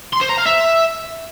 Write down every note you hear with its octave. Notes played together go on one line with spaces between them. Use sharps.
C6
C5
A#5
F5
E5